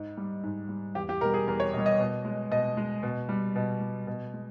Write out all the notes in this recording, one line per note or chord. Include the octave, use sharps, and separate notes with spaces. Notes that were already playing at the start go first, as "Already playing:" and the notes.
Already playing: G#2
G3
G#2
G3
E2 G4
G4
B2 G3 A#4
G#4
E2 A#4
C#5
B2 G3 D#5
D#5
B2
G#3
B2 D#5
G#3
B2
G3
B2
G3
B2
G#3